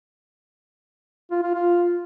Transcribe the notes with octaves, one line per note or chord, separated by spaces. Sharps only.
F4
F4
F4